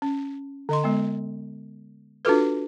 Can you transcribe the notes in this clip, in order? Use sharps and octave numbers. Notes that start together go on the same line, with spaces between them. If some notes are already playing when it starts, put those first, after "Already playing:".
C#4
D3 D#5 C6
G#3 B3
D4 F4 F#4 A4 B4